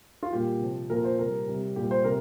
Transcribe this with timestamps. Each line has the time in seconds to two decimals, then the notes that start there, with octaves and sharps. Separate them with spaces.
0.23 F4
0.32 A#2 G3 G4
0.61 C3 F3
0.90 A#2 F3 A#4
1.04 C5
1.18 C3 G3 A#4
1.48 C3 G3
1.76 A#2 G3 G4
1.91 C5
2.04 C3 A#4